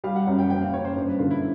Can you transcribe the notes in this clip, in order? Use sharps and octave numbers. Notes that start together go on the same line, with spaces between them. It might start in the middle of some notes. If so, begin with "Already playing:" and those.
G3 F5
F#5
F#2 F#5
G5
F#1 G5
F5
F#1 C#5
C5
G2
B4
D3 F4
E4